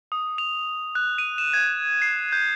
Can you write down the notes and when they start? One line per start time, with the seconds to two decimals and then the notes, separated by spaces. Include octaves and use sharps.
0.12 D#6
0.38 F7
0.95 F#6
1.18 D#7
1.38 E7
1.53 G#6
2.02 C7
2.32 G6